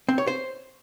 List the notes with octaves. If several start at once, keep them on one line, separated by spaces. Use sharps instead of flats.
C4
C#5
C5